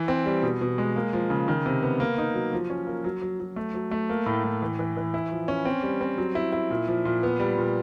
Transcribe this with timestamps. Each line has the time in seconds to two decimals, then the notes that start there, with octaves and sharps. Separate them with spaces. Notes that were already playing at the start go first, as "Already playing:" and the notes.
Already playing: E3
0.08 C4
0.26 G3
0.43 B2
0.61 B2
0.78 G#3
0.96 A#3
1.13 F3
1.30 C#3
1.48 D#3
1.66 C3
1.83 B3
2.00 A#3
2.18 D#4
2.34 F#3
2.53 F3
2.70 C#4
2.87 A#3
3.04 F#3
3.22 F#3
3.40 F#3
3.56 A3
3.74 F#3
3.91 A3
4.09 A#3
4.26 A2
4.44 A2
4.62 E3
4.79 E3
4.97 E3
5.14 E4
5.32 F3
5.48 C#4
5.65 C4
5.83 G3
6.01 C4
6.18 F#3
6.35 E4
6.52 E4
6.70 A#2
6.88 F3
7.05 A#2
7.23 B3
7.40 G3
7.58 A#2